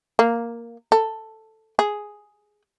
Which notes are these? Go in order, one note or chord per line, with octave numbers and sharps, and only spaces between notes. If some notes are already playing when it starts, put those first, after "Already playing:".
A#3
A4
G#4